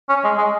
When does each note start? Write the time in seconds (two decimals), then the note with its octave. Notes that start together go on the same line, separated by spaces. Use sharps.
0.09 C#4
0.24 G#3
0.38 G#3